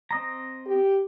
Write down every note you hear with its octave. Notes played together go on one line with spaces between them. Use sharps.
C4 D#5 A#5
G4